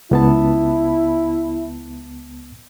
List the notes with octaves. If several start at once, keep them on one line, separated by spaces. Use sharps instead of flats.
C#2 B3 E4 A5